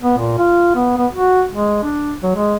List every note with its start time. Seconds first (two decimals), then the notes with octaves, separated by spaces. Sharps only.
0.02 B3
0.18 A#2
0.38 F4
0.75 B3
0.98 B3
1.13 F#4
1.52 G#3
1.83 D4
2.23 F#3
2.36 G#3